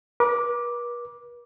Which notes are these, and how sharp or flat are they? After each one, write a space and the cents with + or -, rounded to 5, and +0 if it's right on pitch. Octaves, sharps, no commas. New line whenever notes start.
B4 -45 D6 +0